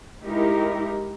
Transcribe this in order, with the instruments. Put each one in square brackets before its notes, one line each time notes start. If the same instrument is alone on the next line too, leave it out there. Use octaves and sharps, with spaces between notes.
[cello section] G#3 D#4 E4 G4 A#4